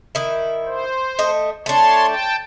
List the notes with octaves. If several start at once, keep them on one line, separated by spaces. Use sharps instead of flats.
D#3 E4
C5
A3 D#5
A3 D4 C#5 A5 C6
G5 A5